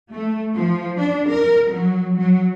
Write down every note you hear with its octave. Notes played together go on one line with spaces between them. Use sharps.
A3
F3
D4
A#4
F#3
F#3